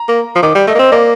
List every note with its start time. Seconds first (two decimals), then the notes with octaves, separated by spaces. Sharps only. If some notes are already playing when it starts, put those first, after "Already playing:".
Already playing: A#5
0.09 A#3
0.35 F3
0.43 D#3 D6
0.55 G3
0.67 A3 D#5
0.75 A#3
0.79 C4
0.92 A#3 D5